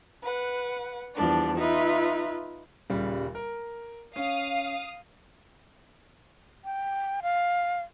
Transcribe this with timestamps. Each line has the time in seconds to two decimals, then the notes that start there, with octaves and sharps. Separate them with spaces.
0.23 B4 F#5
1.15 E2 F3 G3 D4 D5
1.57 D#4 F4 B4 E5
2.90 D#1 C#3 G3
3.35 A#4
4.16 C#4 F5 D#6
6.65 G5
7.22 F5